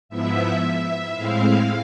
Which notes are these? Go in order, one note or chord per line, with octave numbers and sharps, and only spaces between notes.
G#2 F3 B3 E4 E5
E5
A2 G#3 C4 E4 F5